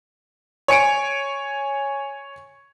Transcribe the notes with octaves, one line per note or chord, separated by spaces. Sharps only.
C#5 G#5 C#7 D7